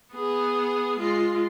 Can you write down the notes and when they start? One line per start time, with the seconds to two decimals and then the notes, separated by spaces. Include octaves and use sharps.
0.13 B3 G#4
0.99 G#3 F4